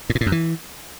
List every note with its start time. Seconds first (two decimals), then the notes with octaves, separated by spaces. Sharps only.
0.10 A2
0.15 A#2
0.21 A2
0.26 F#2
0.32 E3